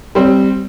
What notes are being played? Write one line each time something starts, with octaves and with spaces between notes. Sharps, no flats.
G3 C4